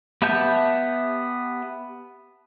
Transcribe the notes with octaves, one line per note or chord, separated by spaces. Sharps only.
B3 G4 E5 A5 G6